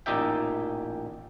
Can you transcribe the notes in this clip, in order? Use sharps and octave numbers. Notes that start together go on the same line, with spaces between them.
A1 A#2 D#4 G4 E5 G5